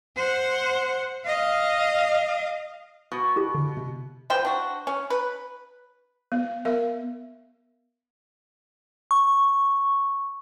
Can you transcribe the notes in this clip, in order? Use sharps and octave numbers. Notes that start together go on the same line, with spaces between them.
C5 F#5
D#5 F5
B2 C#6 D#6
E4 G4
D3
C3
F3 B4 C5 G5
D4 F#4
C#4
B4
B3
B3 A#4 E5
C#6